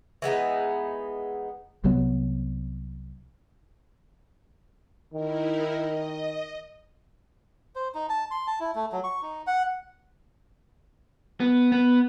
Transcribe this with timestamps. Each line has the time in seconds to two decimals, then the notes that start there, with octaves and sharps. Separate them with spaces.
0.22 E3 G#3 B3 D#4
1.84 C2 C3 F#3 B3
5.14 D#3 D#4 E4 A#4
5.76 D#5
7.75 C5
7.95 D#4
8.09 A5
8.31 C6
8.47 A5
8.60 E4
8.75 A3
8.92 F#3
9.04 C#6
9.22 D#4
9.47 F#5
11.40 B3
11.72 B3